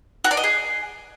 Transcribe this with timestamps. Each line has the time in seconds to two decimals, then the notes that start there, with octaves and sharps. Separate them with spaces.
0.24 F#4
0.31 D5
0.37 D#5
0.44 G#4